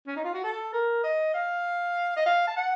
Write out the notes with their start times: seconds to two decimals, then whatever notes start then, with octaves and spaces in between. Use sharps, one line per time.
0.07 C#4
0.16 D#4
0.24 F4
0.34 F#4
0.44 A4
0.73 A#4
1.03 D#5
1.34 F5
2.16 D#5
2.26 F5
2.47 A5
2.56 F#5